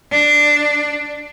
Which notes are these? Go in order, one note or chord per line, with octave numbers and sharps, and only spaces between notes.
D4